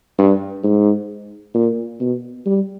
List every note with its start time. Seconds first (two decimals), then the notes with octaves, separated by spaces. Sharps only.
0.18 G2
0.63 G#2
1.54 A#2
2.00 B2
2.46 G3